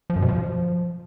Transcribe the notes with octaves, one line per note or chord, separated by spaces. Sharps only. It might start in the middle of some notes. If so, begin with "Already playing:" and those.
F3
F#2
B2
F3